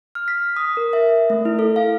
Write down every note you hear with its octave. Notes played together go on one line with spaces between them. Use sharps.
F6
B6
D#6
A#4
E5
A3
E4
A4
F5